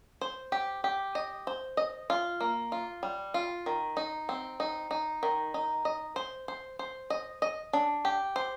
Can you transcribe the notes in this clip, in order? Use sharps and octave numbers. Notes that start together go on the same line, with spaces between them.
C5
G4
G4
D#5
C5
D#5
F4
A#3
F4
G3
F4
D#3
D#4
C4
D#4
D#4
D#3
D#4
D#5
C5
C5
C5
D#5
D#5
D4
G4
C5